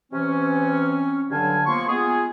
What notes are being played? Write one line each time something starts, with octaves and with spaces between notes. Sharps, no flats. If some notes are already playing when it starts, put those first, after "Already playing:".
C3 E3 C4 C#4
G2 D3 F#3 F5 G#5 A5
F3 A#3 B3 C6 C#6
G#3 B3 F4 G#4